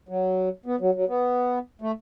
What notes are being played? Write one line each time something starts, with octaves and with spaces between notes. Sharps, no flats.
F#3
B3
F#3
F#3
B3
A3